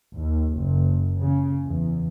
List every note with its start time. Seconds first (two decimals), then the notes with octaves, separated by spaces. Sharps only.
0.14 D#2
0.56 F#1
1.19 C#3
1.63 E2